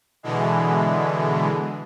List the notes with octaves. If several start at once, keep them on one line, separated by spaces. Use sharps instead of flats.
B2 D3 E3 G#3